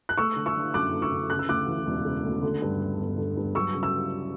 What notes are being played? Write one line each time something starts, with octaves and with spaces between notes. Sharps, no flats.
F#6
A3 C#6 E6
D3
C#6 E6
D4
F#2 D6 F#6
A3
C#6 E6
D3
C#3 F#6
E6
D2 D6 F#6
E3
E1
C#3
D2
D3
G2
A3
G1
D3
G2
F#3 C#6 E6
C#3
E6